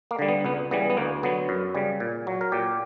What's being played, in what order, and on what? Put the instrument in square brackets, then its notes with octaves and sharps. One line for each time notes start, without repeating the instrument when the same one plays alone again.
[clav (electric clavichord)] A#3
D3 G3
B3
C#2 B3
C#3 E3 G3 B3
B3
D2 A#3
D3 F#3 B3
F#2
C#3 G3
A#2
F#3
A#4
A#2 G4